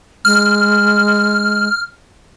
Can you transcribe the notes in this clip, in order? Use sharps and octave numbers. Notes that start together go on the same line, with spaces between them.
G#3 F6